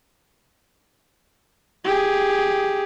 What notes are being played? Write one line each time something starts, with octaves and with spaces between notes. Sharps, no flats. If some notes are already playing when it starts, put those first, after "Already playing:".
G4 G#4